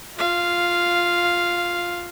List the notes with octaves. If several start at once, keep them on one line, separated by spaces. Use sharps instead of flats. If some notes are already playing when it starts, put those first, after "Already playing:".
F4 F5